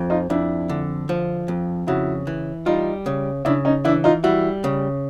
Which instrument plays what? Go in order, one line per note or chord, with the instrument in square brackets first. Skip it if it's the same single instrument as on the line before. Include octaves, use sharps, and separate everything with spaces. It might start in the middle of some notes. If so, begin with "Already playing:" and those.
Already playing: [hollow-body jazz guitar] F2 F3
[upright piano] D#4 F4
[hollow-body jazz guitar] F2 [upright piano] D4 E4
[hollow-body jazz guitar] D3
F3
F2
[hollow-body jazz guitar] C#3 [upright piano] E4 F#4
[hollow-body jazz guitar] E3
[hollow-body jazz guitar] G3 [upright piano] D#4 F4
[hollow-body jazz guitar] C#3
[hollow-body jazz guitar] C#3 [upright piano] D4 E4
[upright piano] C#4 D#4
[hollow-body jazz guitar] E3 [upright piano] D4 E4
[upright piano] D#4 F4
[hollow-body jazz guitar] G3 [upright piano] E4 F#4
[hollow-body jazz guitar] C#3